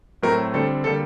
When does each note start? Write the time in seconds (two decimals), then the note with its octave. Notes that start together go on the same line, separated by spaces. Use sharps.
0.23 A2 F#3 A3 C4 A#4
0.54 D3 G3 C4 A4
0.84 D3 G3 A#3 A4